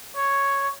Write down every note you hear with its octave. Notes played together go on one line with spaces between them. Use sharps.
C#5